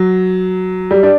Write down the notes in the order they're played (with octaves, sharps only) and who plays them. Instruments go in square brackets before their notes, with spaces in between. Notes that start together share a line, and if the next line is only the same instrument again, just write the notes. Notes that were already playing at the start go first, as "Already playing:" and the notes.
Already playing: [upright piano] F#3
G3
D4